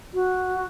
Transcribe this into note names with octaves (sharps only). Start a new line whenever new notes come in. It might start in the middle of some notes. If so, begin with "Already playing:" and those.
F#4